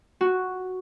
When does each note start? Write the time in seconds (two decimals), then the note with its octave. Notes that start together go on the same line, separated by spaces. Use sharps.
0.21 F#4